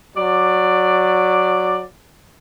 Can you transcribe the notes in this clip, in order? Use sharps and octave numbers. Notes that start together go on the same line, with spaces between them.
F#3 D5